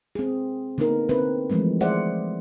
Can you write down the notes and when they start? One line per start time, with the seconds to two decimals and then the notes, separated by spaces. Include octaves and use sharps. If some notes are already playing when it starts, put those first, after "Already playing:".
0.15 C4 G#4
0.78 D3 A#3 B3 D#4 A#4
1.09 D3 C4 B4
1.50 E3 F3 G#3 A3 C4
1.81 G#4 C5 D5 E5 F#5